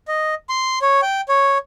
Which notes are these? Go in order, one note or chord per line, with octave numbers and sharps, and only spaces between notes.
D#5
C6
C#5
G5
C#5